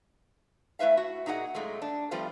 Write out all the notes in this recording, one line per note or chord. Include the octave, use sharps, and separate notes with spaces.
A3 E4 B4 E5 F5
F#4 E5
A#2 D#4 F#4 G#4 F#5
F#2 A#2 G#3 A3
D4
F3 G3 A3 B3 F4 C5